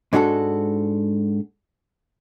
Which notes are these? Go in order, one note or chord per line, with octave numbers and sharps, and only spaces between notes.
G#2 G#3 D4 F#4 G#4 A4